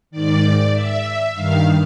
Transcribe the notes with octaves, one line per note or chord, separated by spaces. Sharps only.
G#2 D#3 D5
E5
G2 D#3 F5